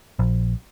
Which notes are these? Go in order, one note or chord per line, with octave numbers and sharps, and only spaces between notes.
A#1